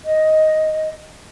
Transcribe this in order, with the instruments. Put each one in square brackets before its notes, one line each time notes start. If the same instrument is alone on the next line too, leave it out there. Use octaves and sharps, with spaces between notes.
[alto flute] D#5